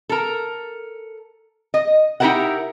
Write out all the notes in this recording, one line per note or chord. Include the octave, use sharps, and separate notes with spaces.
A4 A#4
D#5
D#4 E4 G4 A#4 E5 F#5